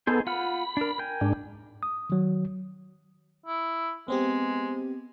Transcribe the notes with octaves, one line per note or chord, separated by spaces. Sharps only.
B3 D#4 G#4 A4 C5
F4 F#5 B5 F6
D4 A#4
A#4 G5 G#5
G#2 D4
D#6
D#3 F#3
E4
G#3 B3 C4 G4